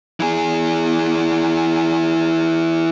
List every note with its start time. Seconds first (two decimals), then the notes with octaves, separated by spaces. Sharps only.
0.20 E3 G#4